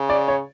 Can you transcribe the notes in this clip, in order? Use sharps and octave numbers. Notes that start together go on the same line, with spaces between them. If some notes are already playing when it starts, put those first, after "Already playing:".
Already playing: C#3
D5
C#5